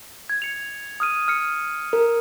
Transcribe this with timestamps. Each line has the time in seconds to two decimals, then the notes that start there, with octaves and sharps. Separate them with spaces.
0.29 G#6
0.42 C#7 F7
1.00 D#6 F6 D#7
1.28 F6 C#7
1.93 A#4